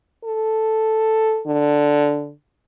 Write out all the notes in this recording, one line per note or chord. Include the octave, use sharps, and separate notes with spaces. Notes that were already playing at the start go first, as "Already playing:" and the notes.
A4
D3